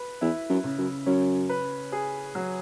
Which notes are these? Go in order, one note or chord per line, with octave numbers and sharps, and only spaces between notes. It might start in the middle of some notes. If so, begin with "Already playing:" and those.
Already playing: B4
E2 E4
F#2
C#3
F#2
F#2 C#4
B4
G#4
F#3